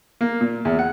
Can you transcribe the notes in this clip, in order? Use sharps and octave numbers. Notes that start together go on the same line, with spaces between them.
A#3
A#2
E2
F#5